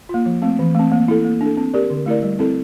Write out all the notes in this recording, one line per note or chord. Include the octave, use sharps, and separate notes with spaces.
A#3 F4
F3
A3 C4
E3
A3 C4
A#3
E4 A4
A#3
D4 A4
C4
G4 A#4 D5
D3
A3 E4 A#4 D5
G3
C4 E4 A4